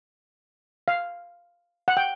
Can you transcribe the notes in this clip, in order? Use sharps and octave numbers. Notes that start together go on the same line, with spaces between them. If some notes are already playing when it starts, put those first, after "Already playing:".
F5
F#5
G5